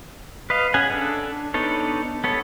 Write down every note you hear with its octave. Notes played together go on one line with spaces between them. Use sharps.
B4 D#5 F5
C#4 G#4 F#5 G#5
D4 A4
B3 D4 D#4 A4 C#5
B3 A4 C#5